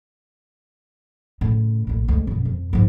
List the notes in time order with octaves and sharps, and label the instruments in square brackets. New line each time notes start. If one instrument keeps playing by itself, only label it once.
[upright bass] A2 C#3
A#1 A2
D2 G#3
F#2 B2
F2
G#2 F3